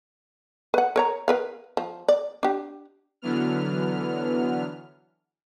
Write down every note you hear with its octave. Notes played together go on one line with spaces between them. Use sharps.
B4 F#5
A#4 C#5 A#5
A#4 B4 F5
F3
D5
D4 G4
D3 E3 F#3 B3 F6